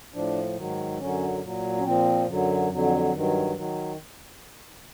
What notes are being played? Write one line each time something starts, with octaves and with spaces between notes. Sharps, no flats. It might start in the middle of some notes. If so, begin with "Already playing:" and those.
A2 F3 D4
G#2 D#3 F#3
F#2 D3 F#3 C#4
A#2 F#3
C#4
A#2 F3 C4
F#2 D3 F#3
F2 D3 F#3
G2 D#3 F#3
D#3 F#3